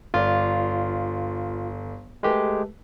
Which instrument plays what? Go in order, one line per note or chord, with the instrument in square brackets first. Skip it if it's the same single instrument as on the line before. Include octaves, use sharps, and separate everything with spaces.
[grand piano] G1 D5 [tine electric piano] F4
[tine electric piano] G#3 G4 [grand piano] A3 B4